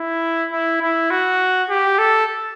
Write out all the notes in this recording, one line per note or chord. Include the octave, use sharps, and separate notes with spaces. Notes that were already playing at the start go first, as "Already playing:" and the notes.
Already playing: E4
E4
E4
F#4
G4
A4